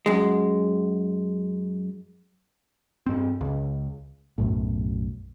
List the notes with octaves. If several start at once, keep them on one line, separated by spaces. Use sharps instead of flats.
F#2 G#3
G2 C4
C#2
B1 F#2 A2